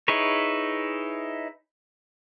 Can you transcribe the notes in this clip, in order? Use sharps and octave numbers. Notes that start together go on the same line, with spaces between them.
D#4 E4 G#4 B4 C#5